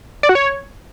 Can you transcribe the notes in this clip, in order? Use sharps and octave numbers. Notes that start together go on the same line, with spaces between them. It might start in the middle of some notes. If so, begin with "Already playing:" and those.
D5
F#4
C#5